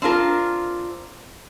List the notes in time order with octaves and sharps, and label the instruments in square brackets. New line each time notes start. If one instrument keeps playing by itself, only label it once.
[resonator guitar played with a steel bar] C4 D4 F4 A#4